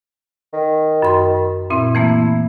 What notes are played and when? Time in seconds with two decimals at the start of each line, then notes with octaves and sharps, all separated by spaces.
0.54 D#3
1.02 F#2 C6
1.70 A#2 C4 E4
1.95 E3 A3 A#3